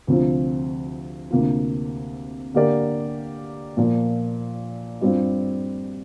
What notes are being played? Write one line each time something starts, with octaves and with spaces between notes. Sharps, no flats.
D2 C3 F3 C4 F4
D2 C3 A#3 F4
D3 A#3 G4 A#4 D5
A#2 F3 A#3
G2 G3 C4 F4